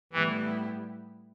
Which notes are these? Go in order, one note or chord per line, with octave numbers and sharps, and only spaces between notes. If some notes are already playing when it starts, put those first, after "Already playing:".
A2 E3 G3 B3 E4 G4